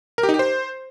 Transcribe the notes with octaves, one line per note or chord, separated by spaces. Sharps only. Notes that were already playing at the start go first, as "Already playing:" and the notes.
A#4
G4
D#4
G4
C5